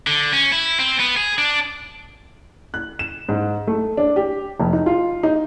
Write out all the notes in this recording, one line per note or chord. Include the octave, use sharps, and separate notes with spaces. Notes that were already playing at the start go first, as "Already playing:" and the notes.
D3
C#4
E4
C4
B3
G#4
D4
F#6
E7
G#2
A3
D4
G4
F1
D#4
F4
D#4